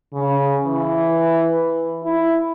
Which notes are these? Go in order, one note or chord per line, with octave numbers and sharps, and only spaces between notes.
C#3
E3
E4